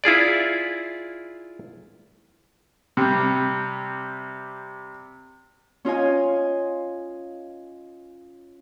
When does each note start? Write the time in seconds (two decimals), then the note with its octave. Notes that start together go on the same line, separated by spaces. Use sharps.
0.04 E4 F4 G#4 D5
2.97 C3 G3
5.85 C#4 F4 D#5 G#5